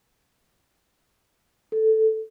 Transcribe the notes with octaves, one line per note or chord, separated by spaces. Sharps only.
A4